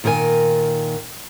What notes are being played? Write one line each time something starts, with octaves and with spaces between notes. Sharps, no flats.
A#2 D#3 A#4 B4 G#5